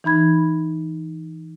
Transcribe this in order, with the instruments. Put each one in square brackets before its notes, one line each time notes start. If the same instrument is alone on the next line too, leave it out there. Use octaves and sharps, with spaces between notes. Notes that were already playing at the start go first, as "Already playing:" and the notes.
[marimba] E3 D#4 B5 G#6